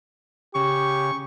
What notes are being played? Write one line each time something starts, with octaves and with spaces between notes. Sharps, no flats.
C#3 G4 C#6